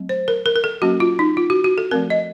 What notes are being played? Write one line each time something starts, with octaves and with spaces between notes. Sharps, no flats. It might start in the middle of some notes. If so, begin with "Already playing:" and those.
Already playing: F#3 A3 C4
C5
A#4
A#4
A#4
A4
F#3 A#3 C#4 F#4
F4
D#4
F4
F#4
F#4
A4
F3 A3 C4 A#4
D#5